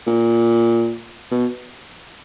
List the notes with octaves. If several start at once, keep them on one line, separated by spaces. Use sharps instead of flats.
A#2
B2